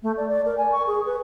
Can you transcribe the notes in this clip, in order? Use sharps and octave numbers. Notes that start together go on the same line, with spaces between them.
A3
D5
D5
A#4
G#5
C#6
G#4
B4